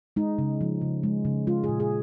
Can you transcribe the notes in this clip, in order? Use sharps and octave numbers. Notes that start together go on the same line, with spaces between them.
G#3 D#4
C#3
F3
C#3
G#3
C#3
G#3 F4
G#4
A#2
G#4